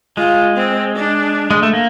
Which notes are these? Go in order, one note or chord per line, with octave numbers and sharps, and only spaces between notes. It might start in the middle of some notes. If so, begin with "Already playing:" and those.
G#3 F4
C4
D4
G#3
A3
A#3